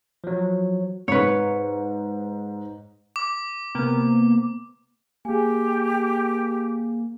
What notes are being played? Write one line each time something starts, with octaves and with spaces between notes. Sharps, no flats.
F3 F#3
G#2 B4 C#5
D6
C3 A#3 B3
A#3 G4 G#4 G#5